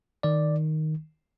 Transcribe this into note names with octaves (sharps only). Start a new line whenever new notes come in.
D#3 D5